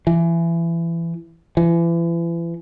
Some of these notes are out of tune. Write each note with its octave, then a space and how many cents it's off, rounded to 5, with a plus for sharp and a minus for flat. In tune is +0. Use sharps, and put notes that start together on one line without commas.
E3 +25
E3 +35